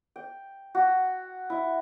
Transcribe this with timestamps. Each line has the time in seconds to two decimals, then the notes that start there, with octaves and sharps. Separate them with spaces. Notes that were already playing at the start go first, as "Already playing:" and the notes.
0.16 G5
0.75 F#4
1.50 E4